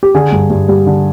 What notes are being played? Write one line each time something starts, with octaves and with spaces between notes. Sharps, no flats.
G4
D3 G#4
G2
G2
G3
D3